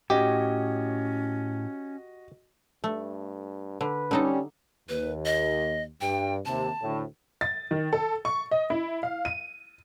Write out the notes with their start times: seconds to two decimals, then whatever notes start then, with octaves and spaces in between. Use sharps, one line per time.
0.10 A2 C#4 F#4 G4 D#5
2.84 G2 A3
3.81 D3 B4
4.11 D3 G3 C#4 D#4 A4
4.89 D#2 B4
5.25 D#5
6.01 G2 G5
6.45 D#2 C3 A5
6.82 D2 A2
7.41 A6
7.71 D#3
7.93 A4
8.25 C#6
8.51 D#5
8.70 E4
9.03 F5
9.25 D#7